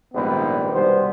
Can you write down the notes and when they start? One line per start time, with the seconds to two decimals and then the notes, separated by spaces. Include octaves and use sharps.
0.14 A#1 G#2 D#3 G3 B3 B4
0.72 C2 B2 G3 B3 C5